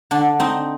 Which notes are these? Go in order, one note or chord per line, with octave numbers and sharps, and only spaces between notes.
D3 D4
C4 D#4